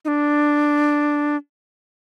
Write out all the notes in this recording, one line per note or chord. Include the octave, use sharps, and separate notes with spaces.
D#4
D4